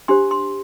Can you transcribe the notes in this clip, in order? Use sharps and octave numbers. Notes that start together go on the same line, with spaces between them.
D4 G4 C5 C6
C6